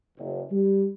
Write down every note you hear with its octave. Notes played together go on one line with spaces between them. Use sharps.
F#1
G3